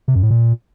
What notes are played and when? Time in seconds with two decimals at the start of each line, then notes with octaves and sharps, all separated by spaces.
0.08 C3
0.15 F#2
0.23 A2
0.30 A#2